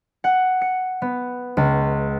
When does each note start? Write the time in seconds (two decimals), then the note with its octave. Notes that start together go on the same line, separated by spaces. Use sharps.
0.24 F#5
0.61 C#7
1.02 B3
1.57 C#2